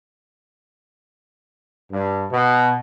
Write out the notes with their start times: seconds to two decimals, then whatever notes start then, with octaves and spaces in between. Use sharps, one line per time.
1.91 G2
2.31 B2